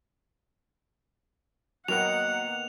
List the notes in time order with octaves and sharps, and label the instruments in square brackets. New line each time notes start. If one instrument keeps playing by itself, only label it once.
[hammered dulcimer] D#3 A#3 B3 [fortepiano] F#3 A#4 F#6 [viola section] F#5 [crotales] F7